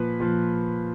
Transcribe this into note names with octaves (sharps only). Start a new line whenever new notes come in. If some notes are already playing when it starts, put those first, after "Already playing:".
Already playing: A#2 F3 B4
A#2 F3